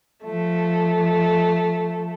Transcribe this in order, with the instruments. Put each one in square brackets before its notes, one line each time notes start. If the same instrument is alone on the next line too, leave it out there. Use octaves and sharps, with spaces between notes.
[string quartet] F3 A3